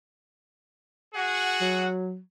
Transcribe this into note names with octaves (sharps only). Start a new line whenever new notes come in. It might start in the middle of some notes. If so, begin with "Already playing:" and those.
F#4 G#4 F#5
F#3